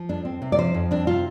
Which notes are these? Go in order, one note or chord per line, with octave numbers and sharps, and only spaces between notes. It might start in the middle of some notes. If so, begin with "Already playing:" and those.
Already playing: F3
F2 D4
C4
C3
D5
F3 C5
F2
C4 D4
C3 F4